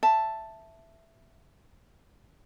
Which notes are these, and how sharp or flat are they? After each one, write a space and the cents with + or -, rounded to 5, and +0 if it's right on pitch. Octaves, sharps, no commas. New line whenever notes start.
E5 +5 A5 +0